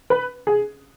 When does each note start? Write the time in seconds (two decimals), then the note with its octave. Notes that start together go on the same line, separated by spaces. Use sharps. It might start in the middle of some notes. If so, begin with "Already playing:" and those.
0.10 B4
0.47 G#4